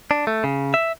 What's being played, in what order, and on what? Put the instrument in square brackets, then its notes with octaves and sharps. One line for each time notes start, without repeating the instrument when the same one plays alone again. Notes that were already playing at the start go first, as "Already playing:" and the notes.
[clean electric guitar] D4
A3
C#3
E5